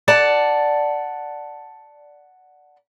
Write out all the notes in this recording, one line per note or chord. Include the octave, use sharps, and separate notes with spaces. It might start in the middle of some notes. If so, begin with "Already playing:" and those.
D5 F#5 A5